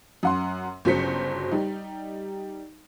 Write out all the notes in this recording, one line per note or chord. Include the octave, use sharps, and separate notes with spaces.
F#2 F#5 C6
G1 C#3 F#3 C5 B6 C#7
G3 D#4